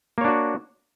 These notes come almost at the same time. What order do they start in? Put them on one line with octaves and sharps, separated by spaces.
A#3 C#5 D4 F#4